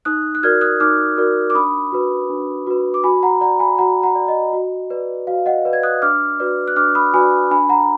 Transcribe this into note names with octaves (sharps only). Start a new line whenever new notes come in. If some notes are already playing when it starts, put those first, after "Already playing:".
D#4 D#6 F#6
F#6
F#4 A#4 D5 F6 G#6
D#6 F#6
D#4 D6 F6
F#4 A#4 D5
D6
D4 B5 D#6
F#4 B4
D4
F#4 B4
D6
F#4 G#5 B5
F#5 A#5
D5 F#5 A#5
G#5 B5
F#4 F#5 A#5
F#5 A#5
D5
D#5
F#4
B4 D5
F#4 F5
D#5 F#5
B4 D5
G#6
D#6 F#6
D4 D6 F6
F#4 B4 D5
F#6
D4 D6 F6
B5 D#6
F#4 B4 D5 G#5 B5
D4 G#5 B5
F#5 A#5